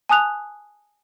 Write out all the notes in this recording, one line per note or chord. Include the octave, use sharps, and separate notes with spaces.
G#5 A5 D#6 F#6 F7